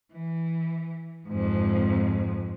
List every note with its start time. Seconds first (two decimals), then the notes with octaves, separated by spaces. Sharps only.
0.12 E3
1.28 F2 G#2